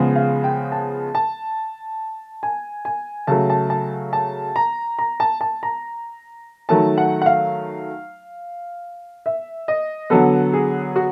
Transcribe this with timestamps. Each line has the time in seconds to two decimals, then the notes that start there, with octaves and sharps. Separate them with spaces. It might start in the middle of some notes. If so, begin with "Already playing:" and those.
Already playing: C#3 F3 G#3 B3
0.15 F5
0.44 G5
0.72 A5
1.15 A5
2.43 G#5
2.85 G#5
3.27 C#3 F#3 A3 A5
3.50 A5
3.70 A5
4.13 A5
4.56 A#5
4.99 A#5
5.20 A5
5.41 A5
5.63 A#5
6.69 D#3 F#3 A3 A5
6.98 F#5
7.22 F#5
7.26 F5
9.26 E5
9.68 D#5
10.10 D3 F#3 B3 A4
10.53 G#4
10.96 F#4